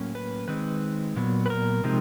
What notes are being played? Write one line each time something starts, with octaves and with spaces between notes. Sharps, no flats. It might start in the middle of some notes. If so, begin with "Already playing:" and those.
Already playing: A2 F#3 A#3 C#4
B4
D#3 G#3 C4 D#4 B4
A#2 F#3 B3
B4
A#4
C3 F3 G#3 C4 D#4